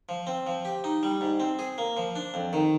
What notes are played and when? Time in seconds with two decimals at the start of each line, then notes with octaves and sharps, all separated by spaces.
0.09 F3
0.27 C4
0.47 F3
0.65 G4
0.84 D#4
1.03 G3
1.21 G#2
1.40 C4
1.59 G#4
1.78 A#3
1.97 F3
2.16 D4
2.34 F2
2.53 D#3